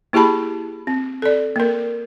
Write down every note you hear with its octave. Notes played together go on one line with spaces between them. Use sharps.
A#3 E4 G4 G#4 A5 B5
C4
A4 D5
A#3 A#4